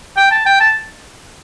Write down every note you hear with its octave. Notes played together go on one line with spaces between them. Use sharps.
G5
A5
G5
A5